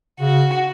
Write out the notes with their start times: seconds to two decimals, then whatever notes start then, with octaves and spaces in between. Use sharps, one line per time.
0.20 C#3 F#4